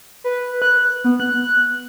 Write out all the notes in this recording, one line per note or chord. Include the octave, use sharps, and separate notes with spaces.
B4
F#6
B3
F#6